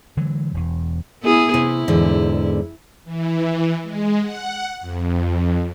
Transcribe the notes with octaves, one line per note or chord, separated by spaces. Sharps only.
D3 E3 F#3 G#3
E1 E2
B3 E4 G#4
C3 E4
E2 G#2 D3
E3
G#3
F#5
F2